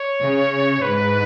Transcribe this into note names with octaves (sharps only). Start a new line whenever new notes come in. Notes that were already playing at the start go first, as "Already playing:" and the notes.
Already playing: C#5
C#3
G#2 B4